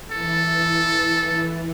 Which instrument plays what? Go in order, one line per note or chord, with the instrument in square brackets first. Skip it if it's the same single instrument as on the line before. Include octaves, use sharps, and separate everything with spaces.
[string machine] E3 [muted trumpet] A4